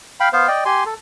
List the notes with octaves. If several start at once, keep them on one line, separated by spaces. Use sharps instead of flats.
F5 G5 B5
B3 C5 F5
D5 D#5 G5
G4 G#5 C6
A4